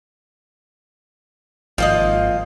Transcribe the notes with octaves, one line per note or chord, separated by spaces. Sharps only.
G#1 F3 A#3 D#5